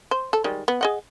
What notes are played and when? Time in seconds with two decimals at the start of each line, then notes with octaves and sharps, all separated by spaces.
0.11 C5
0.33 A4
0.44 D#3 G3 G#3
0.68 B3
0.81 G#4 D#5 F#5